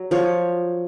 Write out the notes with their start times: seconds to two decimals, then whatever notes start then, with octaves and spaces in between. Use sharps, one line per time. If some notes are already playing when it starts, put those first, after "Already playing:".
Already playing: F#3
0.11 F3 C#5